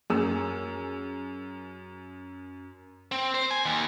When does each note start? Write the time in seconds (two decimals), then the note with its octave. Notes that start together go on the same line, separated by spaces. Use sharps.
0.10 F#2 G#4 A#4 E6
3.12 C4
3.34 C5
3.51 G#5
3.65 D#2